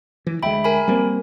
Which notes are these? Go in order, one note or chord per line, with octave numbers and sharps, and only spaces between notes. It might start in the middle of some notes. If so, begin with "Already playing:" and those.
E3
D2 G#3 E5 G5 B5
A#4 G#5 B5
G3 A#3 C4